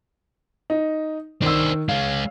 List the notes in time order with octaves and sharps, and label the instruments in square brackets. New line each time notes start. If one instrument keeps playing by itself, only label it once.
[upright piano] D#4
[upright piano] D#3 E6 [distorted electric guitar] D4 C5
[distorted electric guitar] G#3 C#4 [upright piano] F5